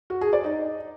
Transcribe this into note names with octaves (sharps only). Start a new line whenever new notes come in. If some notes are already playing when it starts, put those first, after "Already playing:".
F#4
G#4
D5
D#4